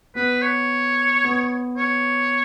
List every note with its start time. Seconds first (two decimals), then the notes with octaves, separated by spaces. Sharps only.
0.15 B3 B4
0.42 C#5
1.24 B3
1.77 C#5